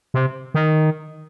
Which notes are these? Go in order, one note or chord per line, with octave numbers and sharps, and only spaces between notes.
C3
D#3